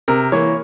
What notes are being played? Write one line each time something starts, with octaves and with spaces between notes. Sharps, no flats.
C3 A#4
E3 A#3 C#5